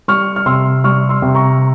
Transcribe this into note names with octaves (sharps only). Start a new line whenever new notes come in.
G3 C#6 F6
F6
C3 C6 E6
G3 C#6 F6
C6 E6
C3
A#5 C#6